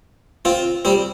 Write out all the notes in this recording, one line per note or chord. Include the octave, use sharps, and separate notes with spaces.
C4 F4
G3 C4